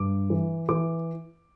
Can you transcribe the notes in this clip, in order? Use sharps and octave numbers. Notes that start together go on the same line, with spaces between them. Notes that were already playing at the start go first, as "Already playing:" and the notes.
Already playing: G2 D6
E3
E3 D6